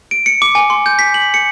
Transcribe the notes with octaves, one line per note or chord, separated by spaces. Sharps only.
D7
C#7
D6
G#5
C6
G6
B6
F#7
C#7